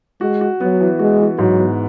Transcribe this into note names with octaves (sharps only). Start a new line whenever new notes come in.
G#3 F#4
F#4
F#3 B3
E3
G#3 F#4
E3
G#2 F#3
B3